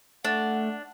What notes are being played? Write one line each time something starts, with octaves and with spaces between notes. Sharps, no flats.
A3 D4 F#5